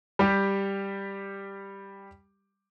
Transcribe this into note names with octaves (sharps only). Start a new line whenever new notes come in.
G3 G4